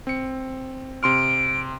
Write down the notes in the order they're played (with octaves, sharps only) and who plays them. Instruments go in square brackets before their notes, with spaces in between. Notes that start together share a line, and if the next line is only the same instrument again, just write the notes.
[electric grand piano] C4 C#7
[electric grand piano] C3 C6 F6 [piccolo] D7